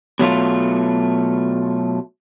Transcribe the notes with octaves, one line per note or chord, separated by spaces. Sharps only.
B2 F#3 A3 F4